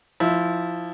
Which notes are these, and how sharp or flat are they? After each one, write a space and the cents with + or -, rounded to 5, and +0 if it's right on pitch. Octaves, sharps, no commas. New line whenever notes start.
F3 +0 E4 -15